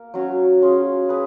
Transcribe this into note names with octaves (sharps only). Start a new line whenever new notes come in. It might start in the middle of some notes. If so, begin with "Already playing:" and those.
Already playing: A#3 A#4
F#3 C#4 F#4 C#5
C#4 F4 G#4
G#4 B4